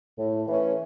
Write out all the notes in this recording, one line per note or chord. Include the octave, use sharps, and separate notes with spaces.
A2
E3 A3 C#4